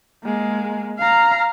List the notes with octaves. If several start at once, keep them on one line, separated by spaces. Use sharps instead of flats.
G#3 A#3
F5 A#5